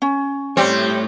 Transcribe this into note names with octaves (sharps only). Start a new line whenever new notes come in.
C#4
G3 A3 C4 C#5